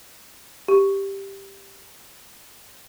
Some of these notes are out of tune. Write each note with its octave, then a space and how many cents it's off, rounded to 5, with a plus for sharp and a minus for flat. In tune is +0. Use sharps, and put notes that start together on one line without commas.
G4 +5